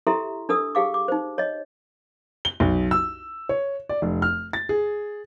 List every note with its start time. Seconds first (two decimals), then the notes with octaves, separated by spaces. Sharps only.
0.07 E4 G4 A4 E5 A#5 C6
0.49 D4 A4 D#6 E6
0.75 G4 G#4 F5 D6
0.94 D6
1.08 D#4 C5
1.38 C#5 D#5
2.45 G7
2.60 B1
2.91 E6
3.49 C#5
3.89 D5
4.02 F1
4.22 F6
4.53 A6
4.69 G#4